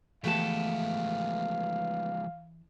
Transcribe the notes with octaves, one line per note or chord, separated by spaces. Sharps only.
E3 F3 G#3 A3 B3 G4 F5 A5